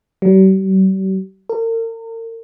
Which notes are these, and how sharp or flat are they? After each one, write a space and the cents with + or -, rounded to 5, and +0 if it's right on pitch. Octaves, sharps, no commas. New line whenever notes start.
G3 -45
A#4 -40